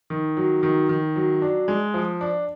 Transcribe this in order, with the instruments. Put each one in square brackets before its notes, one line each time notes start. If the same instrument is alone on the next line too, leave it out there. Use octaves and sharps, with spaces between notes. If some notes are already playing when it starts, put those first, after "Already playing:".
[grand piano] D#3
F#3
D#3
D#3
F#3
D4
G#3
F3
D4